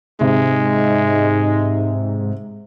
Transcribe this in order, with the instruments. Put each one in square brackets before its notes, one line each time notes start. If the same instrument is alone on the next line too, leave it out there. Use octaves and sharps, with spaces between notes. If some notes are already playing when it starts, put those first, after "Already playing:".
[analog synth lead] G#2 [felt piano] C3 [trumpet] G#3 [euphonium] D#4